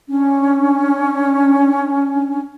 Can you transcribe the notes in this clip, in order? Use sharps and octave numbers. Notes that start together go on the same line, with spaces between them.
C#4 D4